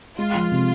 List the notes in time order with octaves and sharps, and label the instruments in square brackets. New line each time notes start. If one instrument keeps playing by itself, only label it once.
[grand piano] G#3 [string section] F4
[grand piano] F3
C3